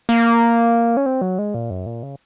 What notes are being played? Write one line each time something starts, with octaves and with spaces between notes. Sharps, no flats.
A#3
C#4
C4
F#3
G#3
A#2
F#2
A#2
C#3